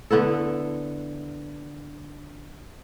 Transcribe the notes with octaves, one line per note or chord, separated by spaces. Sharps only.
D3 B3 E4 A4